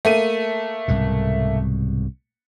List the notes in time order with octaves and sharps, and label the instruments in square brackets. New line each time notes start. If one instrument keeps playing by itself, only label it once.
[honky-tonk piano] A3 A#3 D#7
[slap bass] C2 G#2 B2